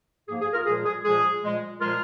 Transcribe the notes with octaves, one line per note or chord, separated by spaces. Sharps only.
G#2 F3 A#3 G#4
G#4
F4 A#4
A#2 F3 G#3 G#4
G#4
A#2 F3 G#3 G#4
A#2 F3 G#3
A#2 F3 G#3 F4 A#4